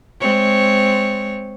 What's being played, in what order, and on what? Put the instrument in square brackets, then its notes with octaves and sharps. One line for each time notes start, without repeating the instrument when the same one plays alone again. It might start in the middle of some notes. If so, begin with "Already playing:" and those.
[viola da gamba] G#3 C4 C#5